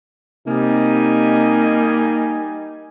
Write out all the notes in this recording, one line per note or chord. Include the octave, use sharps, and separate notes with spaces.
C3 G3 A#3 D#4 D#5 G#5